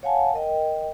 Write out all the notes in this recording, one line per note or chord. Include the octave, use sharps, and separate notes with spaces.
C#5 F5 F#5 G#5 A5
A#4 D#5 G5